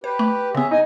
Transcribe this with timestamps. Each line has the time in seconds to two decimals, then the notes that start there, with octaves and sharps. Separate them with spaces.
0.04 G4 B4 C5
0.19 A3
0.55 C#3 B3 C#4 G#4 E5
0.71 D#4 G#4 D#5 G#5